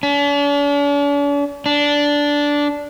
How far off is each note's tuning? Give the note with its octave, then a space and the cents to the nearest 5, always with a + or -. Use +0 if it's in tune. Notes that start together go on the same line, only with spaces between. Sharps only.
D4 -45
D4 -10